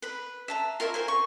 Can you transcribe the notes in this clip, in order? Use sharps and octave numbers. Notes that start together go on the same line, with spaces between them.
B4 B5
E5 A5 A#5
F4 A#4 C#5 E5
A#4 C5 G#5
C#6